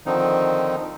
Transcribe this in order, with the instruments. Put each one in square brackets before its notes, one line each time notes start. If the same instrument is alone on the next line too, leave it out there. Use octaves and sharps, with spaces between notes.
[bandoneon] D3 D#3 F3 C4 D#4